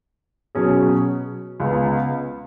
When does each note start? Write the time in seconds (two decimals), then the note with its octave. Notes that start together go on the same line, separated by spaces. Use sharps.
0.55 B2 F#3 C#4 G#4
1.60 C#2 C#3 B3